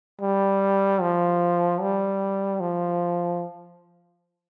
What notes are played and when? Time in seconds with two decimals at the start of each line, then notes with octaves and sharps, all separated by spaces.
0.21 G3
1.02 F3
1.81 G3
2.61 F3